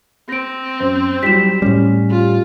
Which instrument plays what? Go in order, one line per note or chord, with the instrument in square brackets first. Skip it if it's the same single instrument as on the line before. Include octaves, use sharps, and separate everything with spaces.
[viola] C4 [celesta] A#6 D7
[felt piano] F#2 [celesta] C5
[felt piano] F#3 G3 [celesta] B6 E7
[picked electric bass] A2 G3 [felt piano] C#4
[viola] F4 [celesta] G4